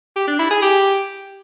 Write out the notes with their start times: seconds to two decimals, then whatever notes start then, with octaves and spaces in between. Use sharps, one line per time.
0.16 G4
0.28 D4
0.39 E4
0.51 G#4
0.62 G4